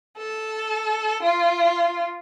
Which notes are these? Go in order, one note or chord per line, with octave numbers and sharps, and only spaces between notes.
A4
F4